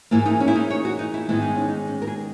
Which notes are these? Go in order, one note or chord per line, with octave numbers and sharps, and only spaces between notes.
G#2 E3 A#3 E4
D#4
C#4
E4
D#4
C#5
F#4
D#4
E4
G#2 D#3 G#3 B3 E4
D#4
C#4
D#4
C#4
A#4
G#4